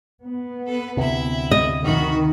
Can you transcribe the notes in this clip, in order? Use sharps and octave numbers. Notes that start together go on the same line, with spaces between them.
B3
A4 B4
D2 C3 E4 E5
D#5
D#3 F#4 B5